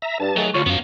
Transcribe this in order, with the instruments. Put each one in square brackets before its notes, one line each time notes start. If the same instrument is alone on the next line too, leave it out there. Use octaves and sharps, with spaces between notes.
[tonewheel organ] E5 A#5
[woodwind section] G2 [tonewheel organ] A5
[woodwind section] D#3 A3 G#4 [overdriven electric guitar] F#3
[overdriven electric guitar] D2 [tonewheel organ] F4 [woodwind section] C#6
[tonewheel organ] F#2 [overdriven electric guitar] B3 F5